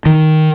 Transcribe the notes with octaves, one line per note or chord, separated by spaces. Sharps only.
D#3